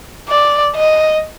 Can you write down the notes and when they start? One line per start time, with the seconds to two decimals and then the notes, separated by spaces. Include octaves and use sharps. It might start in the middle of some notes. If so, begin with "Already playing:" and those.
0.28 D5
0.75 D#5